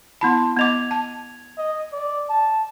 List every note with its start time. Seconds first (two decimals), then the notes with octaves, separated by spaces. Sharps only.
0.21 B3 E4 A5 B5 C6
0.57 B3 D#5 D6 G#6 F7
0.91 A5
1.58 D#5
1.92 D5
2.29 A5